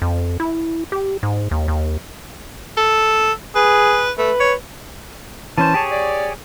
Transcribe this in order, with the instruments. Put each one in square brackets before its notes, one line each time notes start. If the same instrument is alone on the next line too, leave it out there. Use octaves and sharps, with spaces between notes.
[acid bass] F2
E4
G4
G#2
D#2
D#2
[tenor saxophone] A4
[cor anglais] G#4 [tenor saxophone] B4
[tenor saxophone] A3 [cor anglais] B4
[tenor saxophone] C#5
[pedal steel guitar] E3 C#4 C5 [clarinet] A5
[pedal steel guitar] G4 G#4 C#5
[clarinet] D5